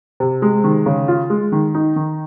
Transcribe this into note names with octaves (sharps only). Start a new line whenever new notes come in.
C3
G#3
D#3
C#3
F4
G#3
D#3
D#4
D#3